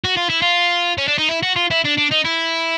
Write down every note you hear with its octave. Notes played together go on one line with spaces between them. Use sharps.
F#4
F4
E4
F4
C#4
D4
D#4
E4
F#4
F4
E4
D4
D4
D#4
E4